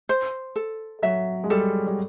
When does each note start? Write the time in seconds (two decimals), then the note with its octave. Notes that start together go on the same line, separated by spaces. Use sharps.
0.09 C5
0.56 A4
1.03 F#3 E5
1.44 G#3
1.50 G3 A4
1.87 G3